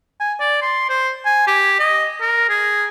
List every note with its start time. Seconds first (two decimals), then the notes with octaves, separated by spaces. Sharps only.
0.20 G#5
0.40 D5
0.62 C6
0.89 C5
1.26 G#5
1.47 G4
1.79 D#5
2.21 A#4
2.49 G#4